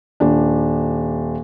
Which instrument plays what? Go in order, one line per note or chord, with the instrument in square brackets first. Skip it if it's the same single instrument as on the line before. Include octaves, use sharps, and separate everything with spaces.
[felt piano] D#1 D4